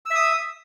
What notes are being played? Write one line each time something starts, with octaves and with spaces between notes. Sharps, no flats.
E5 D#6 E6